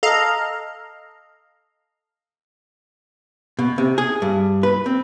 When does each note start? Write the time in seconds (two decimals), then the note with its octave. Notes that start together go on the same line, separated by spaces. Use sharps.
0.03 A4 D#5 F5 A#5
3.59 B2
3.78 C3
3.98 G#4
4.22 G2
4.63 B4
4.86 C4